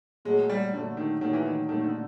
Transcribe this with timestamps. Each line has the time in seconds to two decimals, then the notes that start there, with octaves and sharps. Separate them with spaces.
0.25 A#2 F#3 G#3 A3
0.50 G3
0.73 A#2 D3 F#3 A3
0.97 D#3
1.21 A#2 D#3 F#3 A3
1.33 E3
1.45 D#3
1.68 A#2 D#3 F#3 A3
1.79 D#3
1.84 D3